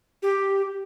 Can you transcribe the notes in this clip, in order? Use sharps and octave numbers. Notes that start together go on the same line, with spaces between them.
G4